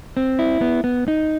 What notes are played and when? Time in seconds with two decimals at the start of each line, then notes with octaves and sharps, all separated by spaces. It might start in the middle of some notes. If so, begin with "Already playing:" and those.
0.17 C4
0.39 E4
0.61 B3
0.84 B3
1.08 D#4